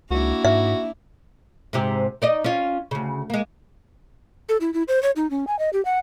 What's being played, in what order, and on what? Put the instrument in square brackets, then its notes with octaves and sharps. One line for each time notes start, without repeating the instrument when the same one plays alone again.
[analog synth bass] C#2 [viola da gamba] A#3 D4 E4 [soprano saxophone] F#4
[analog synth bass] G#2 [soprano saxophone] F#4 [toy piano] E5
[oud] G#2 C3 G4
D#4 D5 D#5
C#4 F4
D2 C#3
G#3 A#3
[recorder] A4
E4
E4
C5
C#5
D#4
C#4
G#5
D#5
G4
F#5